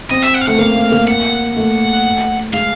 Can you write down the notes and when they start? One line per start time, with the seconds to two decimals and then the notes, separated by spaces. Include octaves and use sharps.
0.11 C4 D#5
0.22 E5
0.34 F#5
0.41 F5
0.47 A3 F#5
0.59 A#3 F5
0.76 A3
0.92 A#3
1.07 F#5
1.56 A3
2.53 G#3 F5